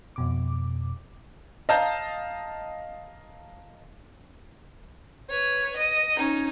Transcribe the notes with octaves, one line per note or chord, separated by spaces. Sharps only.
F2 B2 D6
D#5 F5 A5 A#5 G6
B4 C#5
D#5
C#4 D#4